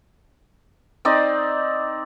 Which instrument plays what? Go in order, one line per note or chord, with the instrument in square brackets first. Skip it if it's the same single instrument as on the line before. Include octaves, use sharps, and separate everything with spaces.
[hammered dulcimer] C4 D#4 D5